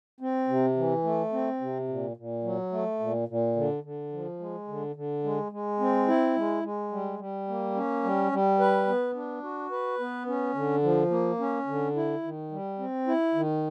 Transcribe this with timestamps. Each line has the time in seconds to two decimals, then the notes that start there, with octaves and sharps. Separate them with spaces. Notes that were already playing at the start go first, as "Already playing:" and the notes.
0.20 C4
0.48 C3
0.77 E3
1.04 A3
1.32 C4
1.61 C3
1.89 A#2
2.17 A#2
2.44 F#3
2.72 A3
3.00 A#2
3.28 A#2
3.56 D3
3.84 D3
4.13 F3
4.40 G#3
4.68 D3
4.96 D3
5.24 G#3
5.52 G#3
5.80 C4
6.08 E4
6.36 G#3
6.64 G#3
6.92 G3
7.19 G3
7.48 A#3
7.75 C#4
8.04 G3
8.32 G3
8.60 B4
8.87 B3
9.15 D4
9.43 F#4
9.71 B4
10.00 B3
10.27 C#4
10.55 D3
10.83 F3
11.10 A#3
11.40 C#4
11.67 D3
11.96 E4
12.23 D#3
12.51 G3
12.79 C4
13.07 E4
13.35 D#3